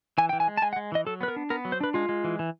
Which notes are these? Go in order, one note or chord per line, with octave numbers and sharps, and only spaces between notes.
E3 G#5
E3 G5
G#5
G#3
A5
G#3 G#5
F#5
G#3
E3 D#5
F#3 A4
B3 B4
A#4
D4
B3 A#4
F#3
C5
D4 B4
G#3 F4
G#3
E3
E3